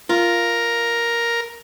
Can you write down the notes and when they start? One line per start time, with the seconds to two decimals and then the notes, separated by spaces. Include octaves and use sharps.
0.09 F4 A#4